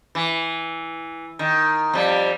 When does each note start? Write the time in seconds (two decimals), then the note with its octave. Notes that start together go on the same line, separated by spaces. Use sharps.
0.15 E3
1.39 D#3
1.93 F2 G3